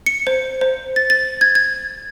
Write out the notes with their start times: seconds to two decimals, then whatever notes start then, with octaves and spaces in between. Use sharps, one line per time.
0.06 C#7
0.27 C5
0.61 C5
0.96 A6
1.10 A6
1.41 G#6
1.55 G#6